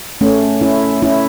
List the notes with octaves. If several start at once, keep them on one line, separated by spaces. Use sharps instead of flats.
A3 C#4
C#4 E4
C#4 E4